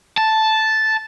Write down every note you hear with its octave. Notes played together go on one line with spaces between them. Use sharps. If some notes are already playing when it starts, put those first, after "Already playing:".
A5